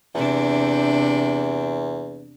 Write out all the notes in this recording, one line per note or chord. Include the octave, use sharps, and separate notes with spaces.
E2 C3 D4